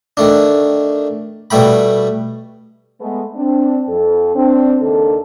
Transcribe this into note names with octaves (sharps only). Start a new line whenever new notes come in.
D#3 A3 D4
B2 G3 A3 G5 B5
G#3 A3 B3
C4 D4
F2 A4
C4 D4
D#2 C#3 D4 A4